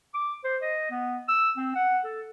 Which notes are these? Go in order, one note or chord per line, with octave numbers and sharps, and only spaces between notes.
D6
C5
D#5
B3
E6
C4
F#5
A4